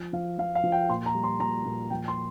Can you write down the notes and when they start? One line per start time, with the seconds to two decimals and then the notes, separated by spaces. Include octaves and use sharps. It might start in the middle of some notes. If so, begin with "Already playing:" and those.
Already playing: F3
0.13 F3 F5
0.38 F3 F5
0.55 F5
0.64 F3
0.72 G5
0.89 A#2 C6
1.06 A#5
1.15 G3
1.24 C6
1.40 A#2 A#5
1.66 A#2
1.90 F3 G5
2.08 C6